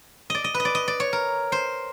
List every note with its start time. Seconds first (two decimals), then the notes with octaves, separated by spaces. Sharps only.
0.30 D5 D#5
0.44 D#5
0.54 B4
0.60 D#5
0.65 D5
0.75 D#5
0.88 D5
1.00 C#5
1.13 A#4
1.52 C5